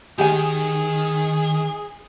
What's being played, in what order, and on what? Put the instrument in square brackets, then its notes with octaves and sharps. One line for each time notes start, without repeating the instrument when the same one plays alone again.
[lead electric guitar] D#3 [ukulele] G4 G#5 [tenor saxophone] G#4